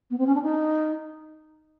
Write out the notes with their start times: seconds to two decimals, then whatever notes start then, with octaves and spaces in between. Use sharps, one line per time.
0.10 B3
0.18 C4
0.27 C#4
0.35 D4
0.42 D#4